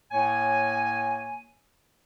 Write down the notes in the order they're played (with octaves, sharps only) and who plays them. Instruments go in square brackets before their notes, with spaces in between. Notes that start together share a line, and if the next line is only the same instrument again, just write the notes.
[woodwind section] A2 A#3 C#5 G#5